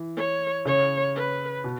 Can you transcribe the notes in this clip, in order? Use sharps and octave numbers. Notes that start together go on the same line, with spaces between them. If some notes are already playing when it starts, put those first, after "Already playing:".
Already playing: E3
C#5
C#3 C#5
B4
B2